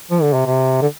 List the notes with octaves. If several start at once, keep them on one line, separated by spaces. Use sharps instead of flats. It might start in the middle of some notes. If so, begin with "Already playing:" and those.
F3
D3
C3
C3
D3